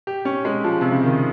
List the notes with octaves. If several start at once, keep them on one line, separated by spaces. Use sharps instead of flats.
G4
C#4
G#3
F3
C3
C#3
D#3